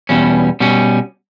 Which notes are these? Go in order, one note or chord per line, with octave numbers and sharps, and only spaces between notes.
E2 B2 G3 C#4
B2 G3 C#4